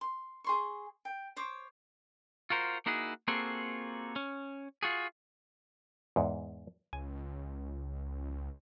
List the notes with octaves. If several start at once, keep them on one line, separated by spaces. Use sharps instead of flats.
C6
G#4 C6 C#6
G5
C5 C#5 D6
F4 F#4 A#4 C5
A#3 D#4 E4 F#4 G#4
A#3 C4 F4 F#4 G#4 A4
C#4
F4 F#4 G#4
E2 G#2
C#2 G#5